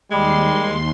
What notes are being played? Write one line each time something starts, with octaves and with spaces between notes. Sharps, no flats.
D#2 G3 G#3 C6